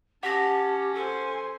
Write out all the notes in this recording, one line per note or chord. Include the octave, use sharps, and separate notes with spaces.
C#4 G4 F#5 A5 A#6
A4 C5 G#5